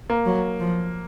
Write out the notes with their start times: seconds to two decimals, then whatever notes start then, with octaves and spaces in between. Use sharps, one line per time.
0.10 A#3
0.26 F#3
0.60 F3